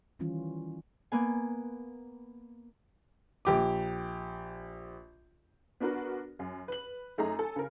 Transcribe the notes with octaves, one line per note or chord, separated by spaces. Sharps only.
D#3 E3 G3 C#4 F4
A#3 B3 G#5
A#1 G4 D6
B3 D4 F#4 A#4 B4
F#2
B4 F#7
F#2 A3 D#4 G#4 A#5
A4 G#5
C#3 A#4